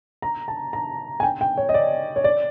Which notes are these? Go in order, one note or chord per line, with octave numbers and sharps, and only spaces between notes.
A#5
A5
A#5
G#5
G5
G5
C#5
D#5
D5
C#5
D5